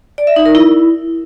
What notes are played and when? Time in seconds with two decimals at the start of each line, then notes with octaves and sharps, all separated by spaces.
0.18 D5
0.27 E5
0.36 D#4
0.46 A#4
0.55 E4